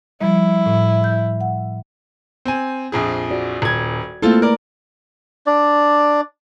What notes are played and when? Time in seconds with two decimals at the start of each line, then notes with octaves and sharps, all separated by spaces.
0.21 F3 G3 E4
0.66 A2
1.04 G6
1.41 F#5
2.45 C4 G#5
2.92 A#1 F2 G#4
3.30 F#4 D5
3.62 D#1 G#6
4.22 A3 A#3 C4 E4 F4 A4
4.42 A#4 B4 D5
5.47 D4 D5